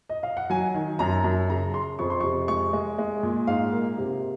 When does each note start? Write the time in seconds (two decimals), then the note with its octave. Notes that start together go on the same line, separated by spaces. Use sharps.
0.09 D#5
0.23 F5
0.37 F#5
0.50 F#3 G#5
0.74 D#3
0.99 F#2 A#5
1.24 F#2
1.50 C#3 A#5
1.74 C#3 C6
1.99 F2 C#6
2.10 C6
2.20 C3 C#6
2.48 G#3 C#6
2.73 G#3
2.98 G#3
3.23 A#2
3.47 G#2 F5
3.72 A#3
3.98 C3